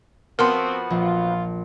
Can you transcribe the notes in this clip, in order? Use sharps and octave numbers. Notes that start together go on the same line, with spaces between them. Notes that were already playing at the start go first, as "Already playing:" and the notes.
F3 B3 C4 F#4 A#4 A5 C6
A#1 F4